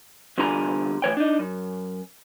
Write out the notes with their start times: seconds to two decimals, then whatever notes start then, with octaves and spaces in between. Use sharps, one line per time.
0.38 E2 D3 G3 F4 G#5 A#5
1.02 A2 E3 C#5 G5
1.17 D4 D#4
1.39 F#2